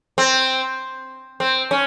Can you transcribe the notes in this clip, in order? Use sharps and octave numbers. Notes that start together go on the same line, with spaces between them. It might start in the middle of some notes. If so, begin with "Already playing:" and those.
C4
C4
C#4